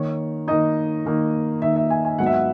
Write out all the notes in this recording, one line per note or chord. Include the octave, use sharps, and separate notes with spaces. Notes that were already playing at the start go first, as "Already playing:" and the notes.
Already playing: D#3 A#3 D#4 C#5
D#3 A#3 D#4 D#5
D#3 A#3 D#4
D#3 A#3 D#4 E5
E5
G#5
G#5
G#2 F#3 B3 F#5
E5
F#5